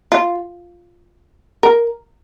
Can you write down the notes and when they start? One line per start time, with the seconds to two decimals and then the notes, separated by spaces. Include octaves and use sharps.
0.12 F4
1.63 A#4